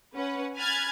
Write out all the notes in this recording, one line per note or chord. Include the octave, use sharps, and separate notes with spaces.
C#4 B4 F#5
G#5 B5 F6 F#6 G#6 A6